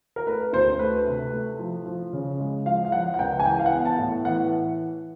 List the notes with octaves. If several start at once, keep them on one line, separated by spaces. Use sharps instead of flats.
A#4
A3 B4
D2 C5
A3 B4
C3
A3
F3
F3
C#3
G#3
F3 F5
F5
F3 F#5
F#5
C#2 G5
G#5
E3 G5
F5
F#5
B3
A5
A2
E3 F#5